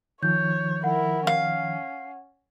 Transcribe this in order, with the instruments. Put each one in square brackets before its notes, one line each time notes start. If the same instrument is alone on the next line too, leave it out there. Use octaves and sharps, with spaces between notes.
[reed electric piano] D#3 F3 [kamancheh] C#5 [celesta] G6
[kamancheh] E4 A#4 [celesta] F#5
[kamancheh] C#4 [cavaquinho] F5